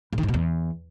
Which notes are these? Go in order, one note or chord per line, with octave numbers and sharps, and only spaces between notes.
A2
D#3
G#2
B2
E2